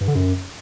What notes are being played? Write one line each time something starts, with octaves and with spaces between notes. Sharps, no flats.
G2
D3
F#2